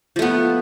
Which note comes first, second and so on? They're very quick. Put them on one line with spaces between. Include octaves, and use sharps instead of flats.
F3 A3 B3